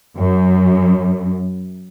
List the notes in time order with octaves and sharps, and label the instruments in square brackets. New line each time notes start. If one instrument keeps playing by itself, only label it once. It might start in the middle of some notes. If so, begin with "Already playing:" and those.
[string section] F#2